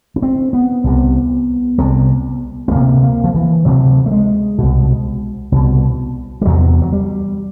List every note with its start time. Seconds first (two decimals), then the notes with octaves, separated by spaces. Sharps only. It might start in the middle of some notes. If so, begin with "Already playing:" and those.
0.16 C#4
0.22 C4
0.53 B3
0.84 C2 C3
1.78 C2 C3
2.68 B3
2.71 D2 C3 A#3
3.03 A#3
3.24 F3
3.35 E3
3.65 D2 C3 F#3
4.06 A3
4.11 G#3
4.58 C2 B2
5.52 C2 B2
6.42 G3
6.45 E2 C3 F#3
6.82 F#3
6.92 G3